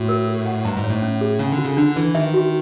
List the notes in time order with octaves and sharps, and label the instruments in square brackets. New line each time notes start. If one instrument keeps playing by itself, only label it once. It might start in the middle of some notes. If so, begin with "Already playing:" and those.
Already playing: [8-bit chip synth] A2 [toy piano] F#4
[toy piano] A#4
A4
F#5
[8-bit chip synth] G2 [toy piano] A#5
[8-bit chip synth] G#2
[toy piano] C#5
[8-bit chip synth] A2
[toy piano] C#4
G#4
[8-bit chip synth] C#3 [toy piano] C#4
[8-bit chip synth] D3
[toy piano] F4
[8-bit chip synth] C#3
[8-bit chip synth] D3 [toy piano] D4
[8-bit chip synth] E3 [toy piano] B4
[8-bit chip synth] D#3 [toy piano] E5
[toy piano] F#4